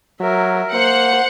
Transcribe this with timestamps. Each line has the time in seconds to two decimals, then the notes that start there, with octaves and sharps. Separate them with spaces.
0.21 F#3 A#4 E5
0.73 A#3 C5 F#5